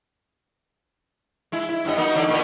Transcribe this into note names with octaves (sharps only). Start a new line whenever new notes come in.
G#3 E4
E4
G2 B3 D#5
A#3 D#4 F#4
E2 D3 D5
A#2 A#3 B3